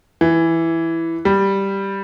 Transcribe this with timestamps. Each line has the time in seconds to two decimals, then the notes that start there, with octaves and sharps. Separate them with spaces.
0.21 E3
1.25 G3